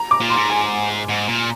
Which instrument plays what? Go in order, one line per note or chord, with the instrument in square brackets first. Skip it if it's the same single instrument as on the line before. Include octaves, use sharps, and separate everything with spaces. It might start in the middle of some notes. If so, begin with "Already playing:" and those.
Already playing: [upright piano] A#5
D6
[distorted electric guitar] A#2
[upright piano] C6
[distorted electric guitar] G#2
[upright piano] G#5
[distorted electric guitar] G#2
A#2